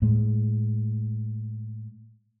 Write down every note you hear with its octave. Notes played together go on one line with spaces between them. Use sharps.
A2 G#3